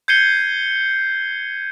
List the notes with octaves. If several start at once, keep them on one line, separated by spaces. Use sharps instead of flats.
G6 G#6 C7 C#7 D#7 G7